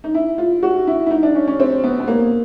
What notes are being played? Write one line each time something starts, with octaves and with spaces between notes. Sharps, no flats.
D#4
E4
F4
F#4
E4
E4
D#4
D4
C#4
C#4
C4
B3
B3
A#3